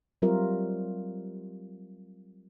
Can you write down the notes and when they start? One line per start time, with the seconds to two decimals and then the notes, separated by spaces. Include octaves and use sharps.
0.22 F#3 G3 C4 F4 A#4 E5